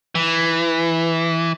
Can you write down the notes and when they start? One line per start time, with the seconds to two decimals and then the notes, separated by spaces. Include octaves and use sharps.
0.15 E3